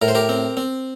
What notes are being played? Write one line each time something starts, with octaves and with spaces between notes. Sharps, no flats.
A2 A#4
C5
G4 A#4
C4
C4